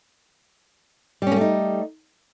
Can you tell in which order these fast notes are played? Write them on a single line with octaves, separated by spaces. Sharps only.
G3 C#4 A#3 A3 D#4